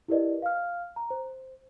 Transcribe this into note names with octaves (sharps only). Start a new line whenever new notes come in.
E4 G4 A#4 B4 D5 D#5
F5 F6
A#5
C5